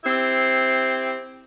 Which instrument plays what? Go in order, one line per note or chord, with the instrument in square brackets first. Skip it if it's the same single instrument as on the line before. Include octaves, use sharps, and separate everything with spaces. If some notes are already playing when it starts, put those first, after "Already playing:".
[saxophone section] C4 E4 G4